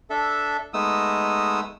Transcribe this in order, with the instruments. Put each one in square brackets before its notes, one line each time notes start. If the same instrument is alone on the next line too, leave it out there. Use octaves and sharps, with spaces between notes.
[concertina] D4 A4 E5
G#3 A3 B3 D#4 D#6 E6